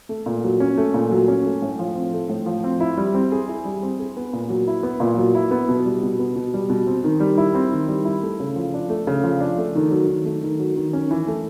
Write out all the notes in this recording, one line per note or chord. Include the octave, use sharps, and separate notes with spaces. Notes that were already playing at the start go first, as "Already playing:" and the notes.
A3
A#2
F#3
C#4
A3
A#2
F#3
C#4
A3
A2
F3
C4
A3
A2
F3
C4
E4
G3
C4
G#4
E4
G3
C4
G#4
B3
A#2
F#3
E4
B3
A#2
F#3
E4
B3
B2
G3
B2
B3
B2
G3
B2
C4
D#3
G3
E4
C4
D#3
G3
E4
A3
C#3
F3
D4
A3
C#3
F3
D4
A3
D#3
F#3
D#3
A3
D#3
F#3
D#3
C#4
E3
A3